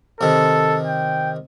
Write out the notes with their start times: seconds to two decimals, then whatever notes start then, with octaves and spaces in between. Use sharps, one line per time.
0.21 C3 D#3 A4
0.86 G5